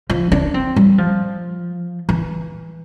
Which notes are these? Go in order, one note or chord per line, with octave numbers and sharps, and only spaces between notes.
F3
D4
C4
G3
F3
E3